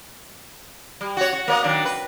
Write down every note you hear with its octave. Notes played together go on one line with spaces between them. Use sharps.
G3
F#4 C#5
F#4
A#3 C#5 D#5
D#3 F#3 D4
B4